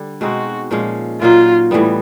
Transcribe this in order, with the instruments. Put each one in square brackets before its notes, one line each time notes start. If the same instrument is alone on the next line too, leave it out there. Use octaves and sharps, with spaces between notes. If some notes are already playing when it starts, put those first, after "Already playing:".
Already playing: [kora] D3 G3
[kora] B2 G#3 C4 D#4 [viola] F#4
[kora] A#2 F3 G#3 C#4
[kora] A#2 F#3 A#3 D#4 [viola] F4
[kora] A2 E3 G3 B3